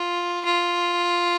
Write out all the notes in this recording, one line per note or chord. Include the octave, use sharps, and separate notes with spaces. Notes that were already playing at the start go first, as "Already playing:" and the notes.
Already playing: F4
F4